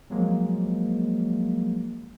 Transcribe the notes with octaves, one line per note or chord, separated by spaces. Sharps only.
F3 F#3 G#3 A#3